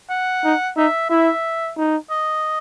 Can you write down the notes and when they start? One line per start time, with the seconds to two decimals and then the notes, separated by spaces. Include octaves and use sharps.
0.10 F#5
0.44 D#4
0.77 D#4 E5
1.10 E4 E5
1.77 D#4
2.10 D#5